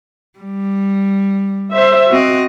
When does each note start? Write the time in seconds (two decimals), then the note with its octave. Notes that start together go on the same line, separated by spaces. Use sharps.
0.38 G3
1.74 C5 E5
2.10 C4 F#4 D#5